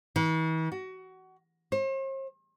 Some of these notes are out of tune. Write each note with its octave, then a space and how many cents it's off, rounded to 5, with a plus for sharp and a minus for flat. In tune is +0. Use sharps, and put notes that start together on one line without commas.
E3 -45
F#4 +25
C5 +45